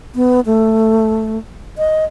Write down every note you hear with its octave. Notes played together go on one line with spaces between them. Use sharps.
B3
A3
D#5